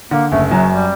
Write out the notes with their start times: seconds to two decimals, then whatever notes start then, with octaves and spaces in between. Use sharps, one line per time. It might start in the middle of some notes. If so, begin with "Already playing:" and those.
0.11 D3 A#3
0.31 F#1 A3
0.51 F#2 F#3
0.71 G3